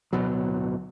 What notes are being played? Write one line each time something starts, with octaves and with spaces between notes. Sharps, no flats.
D1 G1 B2 F#3